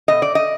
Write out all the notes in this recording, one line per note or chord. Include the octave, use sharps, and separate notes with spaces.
B2 D#5
D5
D#5